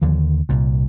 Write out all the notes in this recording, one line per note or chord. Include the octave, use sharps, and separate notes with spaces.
D#2 D3 F3
C2 A#2